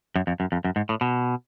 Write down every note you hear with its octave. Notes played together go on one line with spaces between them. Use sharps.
F#2
F2
F#2
F2
F#2
G#2
A2
B2